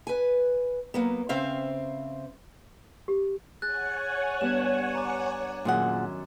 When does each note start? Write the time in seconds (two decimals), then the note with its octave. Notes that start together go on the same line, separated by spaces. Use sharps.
0.07 B4 G#5
0.94 F#3 A#3 B3
1.29 C#3 C4 C5 E5 F5
3.08 G4
3.62 G#4 C#5 F#5 G#5 F#6 A6
4.41 G2 B3 D4 E7
4.95 A#5 D6
5.65 F#2 A#2 D#3 G#4 F#5 C6